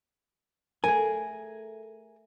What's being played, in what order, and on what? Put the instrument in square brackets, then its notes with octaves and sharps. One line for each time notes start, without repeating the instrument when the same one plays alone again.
[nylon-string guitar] A3 [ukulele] G#4 A#4 [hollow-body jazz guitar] G#5